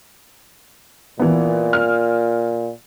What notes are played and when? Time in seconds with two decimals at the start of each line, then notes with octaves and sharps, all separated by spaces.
1.19 A#2 E3 B3
1.73 F6